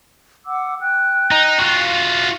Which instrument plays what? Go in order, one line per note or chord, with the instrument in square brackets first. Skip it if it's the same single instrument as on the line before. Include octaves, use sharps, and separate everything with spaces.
[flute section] F#5 D6 E6
G5 F#6
[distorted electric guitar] D#4
F4 F#4